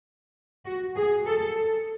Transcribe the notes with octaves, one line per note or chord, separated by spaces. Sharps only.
F#4
G#4
A4